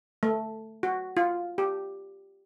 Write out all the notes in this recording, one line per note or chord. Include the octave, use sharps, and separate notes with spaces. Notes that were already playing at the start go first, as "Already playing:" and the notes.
A3
F#4
F4
G4